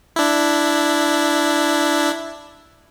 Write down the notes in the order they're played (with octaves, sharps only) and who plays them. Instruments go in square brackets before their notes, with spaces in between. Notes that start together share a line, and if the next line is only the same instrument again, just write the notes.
[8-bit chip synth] D4 E4